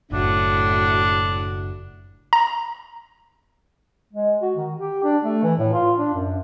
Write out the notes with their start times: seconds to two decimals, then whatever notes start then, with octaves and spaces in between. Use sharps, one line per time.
0.12 F#1 A2 D4 F#4
2.33 A#5
4.13 G#3
4.42 F#4
4.56 D#3
4.76 G4
5.04 D4
5.23 A3
5.43 E3
5.58 A2
5.73 F4
5.97 D4
6.14 F#2